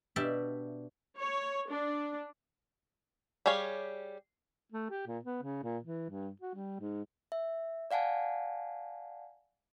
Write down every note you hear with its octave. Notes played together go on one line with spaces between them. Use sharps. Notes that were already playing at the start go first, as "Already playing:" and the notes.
B2 D4 G4 D5 E5
C#5
D4
G3 G4 G#4 C#5 F5
A3
G4
A#2
B3
C#3
A#2
E3
G2
F#4
G3
G#2
E5
D5 F5 F#5 G#5 A5